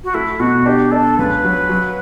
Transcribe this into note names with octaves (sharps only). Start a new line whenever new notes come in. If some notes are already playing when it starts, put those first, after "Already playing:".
F#4
A3 E4
B2 F#4
D4 G4
D4 A4
C#2 B4
F#3
F#3